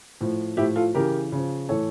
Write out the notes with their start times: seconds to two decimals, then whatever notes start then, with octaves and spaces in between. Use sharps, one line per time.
0.21 A2 F3
0.57 A2 F3 E4 G4
0.76 F4 A4
0.94 C#3 E3 G4 A#4
1.32 C#3 F3
1.69 A2 E3 A4 C#5